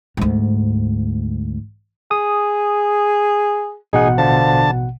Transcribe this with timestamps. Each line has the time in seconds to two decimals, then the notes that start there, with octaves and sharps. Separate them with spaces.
0.17 D2 G#2
2.11 G#4 D#6
3.93 A1 B2 D#4 G#4 F#5
4.18 D3 F3 A5